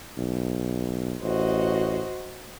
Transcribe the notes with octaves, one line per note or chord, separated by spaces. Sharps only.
B1
A1 F#4 C5 D#5